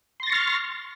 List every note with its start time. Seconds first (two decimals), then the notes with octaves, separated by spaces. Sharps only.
0.20 C6
0.23 A#6
0.26 A6
0.30 C#6
0.33 F6